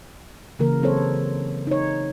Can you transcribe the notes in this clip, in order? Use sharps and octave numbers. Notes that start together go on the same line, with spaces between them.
C#3 E3 A#3 A#4
F#3 C4 A4 C5 C#5
D#4 C#5